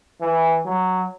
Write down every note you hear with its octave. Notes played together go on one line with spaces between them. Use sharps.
E3
F#3